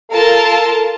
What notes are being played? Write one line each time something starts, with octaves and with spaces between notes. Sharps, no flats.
F4 A4 A#4 A5